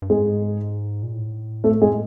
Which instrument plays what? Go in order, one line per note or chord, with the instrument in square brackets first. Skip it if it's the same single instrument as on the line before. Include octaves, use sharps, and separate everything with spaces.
[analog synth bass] G2
[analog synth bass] G#2 [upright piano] G#3 G#4
[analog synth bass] A#2
A2
[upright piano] A3 A4
G#3 G#4